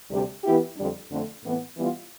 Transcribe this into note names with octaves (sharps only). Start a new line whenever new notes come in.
D2 C3 G3 D4 G4
E3 B3 E4 G4
F2 D3 G3 D4
F2 D3 A3 C4
A2 E3 B3
E3 G3 B3 F4